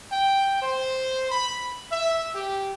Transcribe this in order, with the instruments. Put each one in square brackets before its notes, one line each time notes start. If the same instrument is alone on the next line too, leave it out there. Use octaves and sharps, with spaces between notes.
[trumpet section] G5
C5
B5
E5
G4